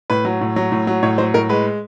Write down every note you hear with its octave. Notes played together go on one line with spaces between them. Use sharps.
A2 B4
F#3
A2
F#3
A2
F#3
A2 C#5
F#3 C5
A2 A#4
G#3 B4